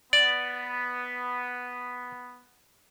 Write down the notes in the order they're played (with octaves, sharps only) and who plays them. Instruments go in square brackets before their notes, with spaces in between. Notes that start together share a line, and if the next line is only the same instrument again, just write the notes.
[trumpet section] B3 [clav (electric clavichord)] D5